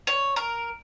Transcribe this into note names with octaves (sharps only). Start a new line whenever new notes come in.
C#5
A#4